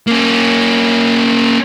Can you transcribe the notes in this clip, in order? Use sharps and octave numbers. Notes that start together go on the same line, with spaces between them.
A#3 C#4